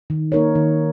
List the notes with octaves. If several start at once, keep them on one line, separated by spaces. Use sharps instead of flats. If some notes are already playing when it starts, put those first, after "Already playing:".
D#3
A#3 D#4 A#4 C#5
D#3